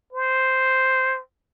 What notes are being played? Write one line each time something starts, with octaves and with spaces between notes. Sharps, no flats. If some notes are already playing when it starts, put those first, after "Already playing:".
C5